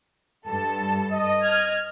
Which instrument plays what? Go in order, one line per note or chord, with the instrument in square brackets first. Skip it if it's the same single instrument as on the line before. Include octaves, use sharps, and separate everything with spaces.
[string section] G2 A4 A5
[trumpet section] D#5
[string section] F6 G#6